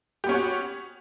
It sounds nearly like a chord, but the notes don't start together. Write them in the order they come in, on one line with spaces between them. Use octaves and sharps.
G4 B3 C#4 C#5 F#4